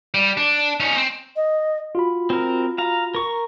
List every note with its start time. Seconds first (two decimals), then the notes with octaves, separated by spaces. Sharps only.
0.14 G3
0.37 D4
0.80 C#4 D#4
0.97 C4
1.36 D#5
1.95 F4 F#4 B5
2.30 C4 A#4
2.78 F5 A#5
3.15 A#4 C#6